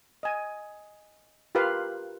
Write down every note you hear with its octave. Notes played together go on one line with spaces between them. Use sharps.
D#5 G#5
F4 G4 A#4 B4 F5